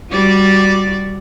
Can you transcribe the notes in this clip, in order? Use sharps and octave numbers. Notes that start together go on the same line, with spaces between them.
G3 F#4 D5